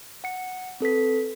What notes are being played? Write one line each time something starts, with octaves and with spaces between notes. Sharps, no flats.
F#5 C#7
C4 A4 B4 B6